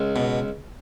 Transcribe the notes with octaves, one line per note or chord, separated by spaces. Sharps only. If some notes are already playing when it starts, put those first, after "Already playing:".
Already playing: C#2
B2